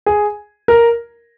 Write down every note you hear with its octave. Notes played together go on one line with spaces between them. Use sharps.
G#4
A#4